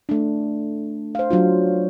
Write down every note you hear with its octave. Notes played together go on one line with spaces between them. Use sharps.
A3 D4
C5 F5
F#3 D4 F4